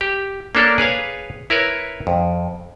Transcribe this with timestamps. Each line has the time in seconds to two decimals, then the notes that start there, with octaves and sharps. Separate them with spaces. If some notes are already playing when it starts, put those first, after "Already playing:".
0.01 G4
0.55 A#3 C#4 D4 A4 A#4
0.78 G#4 B4 C#5 F5
1.50 E4 A#4 B4 C#5
2.07 F2